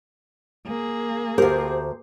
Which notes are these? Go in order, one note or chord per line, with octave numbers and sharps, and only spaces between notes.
A#3 G#4
D2 G4 A#4 C5